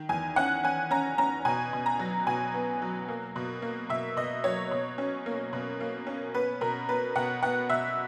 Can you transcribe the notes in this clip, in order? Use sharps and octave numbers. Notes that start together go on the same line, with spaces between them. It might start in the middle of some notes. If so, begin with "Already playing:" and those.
Already playing: D#3
E2 G#5
C#4 F#5
C#4 G#5
C#4 A#5
C#4 A#5
B2 G#5
B2
A#5
F#3
B2 G#5
B3
F#3
A#3
B2
A#3
B2 E5
B2 D#5
F#3 C#5
B2
C#4
A#3
B2
A#3
C#4
B3 B4
B2 A#4
B3 B4
B2 F#5
B3 F#5
B2 E5